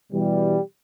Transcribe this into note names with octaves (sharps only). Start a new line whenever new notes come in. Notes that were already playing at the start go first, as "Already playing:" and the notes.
B2 E3 G3